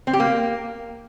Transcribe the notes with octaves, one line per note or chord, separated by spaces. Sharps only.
C4
G4
A#3